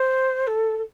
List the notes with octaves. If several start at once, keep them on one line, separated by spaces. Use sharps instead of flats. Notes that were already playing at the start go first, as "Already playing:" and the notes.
Already playing: C5
A4
A4